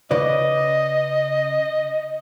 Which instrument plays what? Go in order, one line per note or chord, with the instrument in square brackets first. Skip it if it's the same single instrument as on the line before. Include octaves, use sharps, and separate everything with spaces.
[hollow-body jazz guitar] C#3 B4 D5 [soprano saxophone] D#5